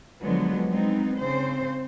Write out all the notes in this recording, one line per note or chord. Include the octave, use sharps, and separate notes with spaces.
D3 F3 F#3 G#3 B3
G#3 B3 C4 D#4
C#3 C4 C5